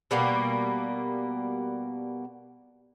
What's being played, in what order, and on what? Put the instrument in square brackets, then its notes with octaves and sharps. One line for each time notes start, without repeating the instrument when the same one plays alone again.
[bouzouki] B2 G3 A#3 B3